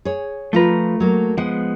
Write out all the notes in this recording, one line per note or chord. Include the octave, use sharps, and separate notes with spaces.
G#4 C#5
F3 A3 F4 B4 A#5
F#3 A#3
F3 G#3 B3 F#5